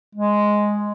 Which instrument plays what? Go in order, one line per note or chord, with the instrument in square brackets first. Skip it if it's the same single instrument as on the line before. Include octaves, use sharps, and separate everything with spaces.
[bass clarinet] G#3